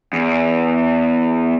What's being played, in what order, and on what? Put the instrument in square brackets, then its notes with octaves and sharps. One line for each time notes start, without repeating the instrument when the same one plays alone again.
[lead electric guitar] E2